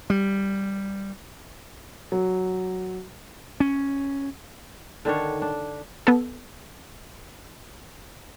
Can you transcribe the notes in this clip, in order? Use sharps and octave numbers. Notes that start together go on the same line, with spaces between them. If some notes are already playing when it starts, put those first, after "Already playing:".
G3
F#3
C#4
D3 D#3 D4 C#5
D4
B3 A4